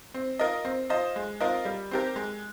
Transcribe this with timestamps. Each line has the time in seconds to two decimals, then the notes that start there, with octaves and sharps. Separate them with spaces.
0.14 C4
0.39 F4 A#4 D#5
0.65 C4
0.89 F4 C5 D#5
1.16 G#3
1.41 C4 F4 A#4 D#5
1.65 G3
1.91 C4 G4 A#4
2.16 G#3